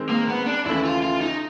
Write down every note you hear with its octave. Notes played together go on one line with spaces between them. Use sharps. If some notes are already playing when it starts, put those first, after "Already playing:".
Already playing: D#3 G#3 C4
A#3
B3
D4
D#2 C#3 E3 A3 E4
F4
F4
D#4